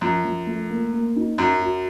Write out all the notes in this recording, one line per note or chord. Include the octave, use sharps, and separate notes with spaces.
F#2 F3
F3
A3
A#3
A#3
D#4
F#2 F#4
F#4